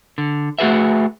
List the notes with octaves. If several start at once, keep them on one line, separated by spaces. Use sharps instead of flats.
D3
A3 F#4 G#4 B4 E5